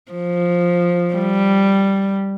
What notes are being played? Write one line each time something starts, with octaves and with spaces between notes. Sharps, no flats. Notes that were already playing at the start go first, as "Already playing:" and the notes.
F3
G3